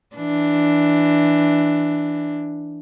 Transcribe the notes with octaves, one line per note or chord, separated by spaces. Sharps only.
E3 D4